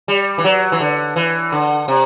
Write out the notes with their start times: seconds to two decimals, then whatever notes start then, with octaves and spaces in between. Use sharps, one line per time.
0.08 G3
0.38 E3
0.44 F#3
0.72 E3
0.80 D3
1.16 E3
1.52 D3
1.88 C3